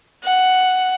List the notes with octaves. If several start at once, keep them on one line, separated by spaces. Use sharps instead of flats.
F#5